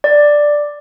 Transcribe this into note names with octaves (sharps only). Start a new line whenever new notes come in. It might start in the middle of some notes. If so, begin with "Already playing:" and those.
D5